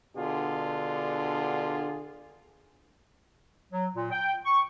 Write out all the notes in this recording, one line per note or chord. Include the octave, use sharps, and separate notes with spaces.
B2 D3 D4 F4 G#4
F#3
A#2
G5
C#6